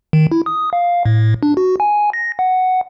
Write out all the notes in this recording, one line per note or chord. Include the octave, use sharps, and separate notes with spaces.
D#3
E4
D#6
F5
A2
D4
F#4
G#5
A#6
F#5